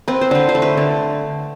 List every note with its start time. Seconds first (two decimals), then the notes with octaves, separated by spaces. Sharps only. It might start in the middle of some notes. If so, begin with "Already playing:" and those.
0.08 C4 B4
0.21 C5
0.31 D3 B4
0.49 C5
0.55 A3
0.62 B4
0.77 D3